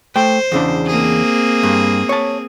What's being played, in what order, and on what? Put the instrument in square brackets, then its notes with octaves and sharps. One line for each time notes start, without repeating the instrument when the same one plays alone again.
[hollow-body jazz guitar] A3 G5 [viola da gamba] C5
[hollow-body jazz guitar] E2 C#3 D4
[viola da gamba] A#3 C4 G#4
[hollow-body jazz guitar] G2
C#5 A5